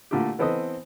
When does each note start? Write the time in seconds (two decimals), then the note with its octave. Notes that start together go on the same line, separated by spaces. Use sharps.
0.11 A#2 D3 A3 A#3 E4 G4
0.39 E3 B3 C4 A4 D#5 D#6